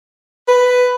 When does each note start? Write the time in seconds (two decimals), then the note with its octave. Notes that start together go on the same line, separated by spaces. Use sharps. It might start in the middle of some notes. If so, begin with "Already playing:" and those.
0.48 B4